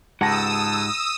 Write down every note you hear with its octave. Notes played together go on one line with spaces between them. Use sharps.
C#2 G#2 G4 F#5 A5 D#6 E6 A#6